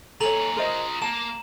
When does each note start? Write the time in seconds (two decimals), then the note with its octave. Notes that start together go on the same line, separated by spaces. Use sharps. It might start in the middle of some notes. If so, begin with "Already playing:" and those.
0.21 D#2 A4 C#5 G#5 A#5 F7 F#7
0.57 F4 G#4 A#4 C5 D#5
1.02 A#3 A5 E7